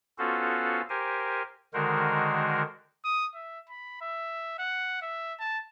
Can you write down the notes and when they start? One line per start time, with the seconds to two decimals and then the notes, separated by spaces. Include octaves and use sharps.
0.18 B3 C#4 F4 F#4 A4 C5
0.90 G4 A#4 C5 G#5
1.74 D3 D#3 G#3 F#4 A#4 C5
3.05 D#6
3.35 E5
3.70 B5
4.02 E5
4.59 F#5
5.02 E5
5.40 A5